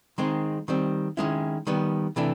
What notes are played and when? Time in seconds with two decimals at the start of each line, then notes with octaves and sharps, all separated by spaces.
0.18 D#3 G#3 C4 D#4
0.68 D#3 G3 C4
1.17 D#3 G#3 C#4 E4
1.67 D#3 G3 B3
2.16 C3 E3 A3 D4